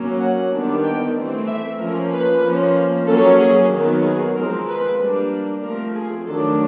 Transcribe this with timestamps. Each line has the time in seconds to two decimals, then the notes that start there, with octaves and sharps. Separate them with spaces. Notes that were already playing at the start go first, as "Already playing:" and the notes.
Already playing: F#3 A#3 C#4
0.19 F#5
0.52 D#3 G3 B3 D4
0.83 G5
1.15 E3 A3 C4
1.47 E5
1.79 F3 A#3 C#4 A#4
2.12 B4
2.43 F3 A#3 C#4
3.07 F#3 A#3 C#4 A4
3.39 G#4
3.70 D#3 F#3 B3
4.03 G#4
4.34 F3 G#3 C4 A#4
4.66 B4
4.98 G3 A#3 D4
5.62 F3 A3 C4 A#4
5.94 G#4
6.26 D#3 F#3 A3 D4 A4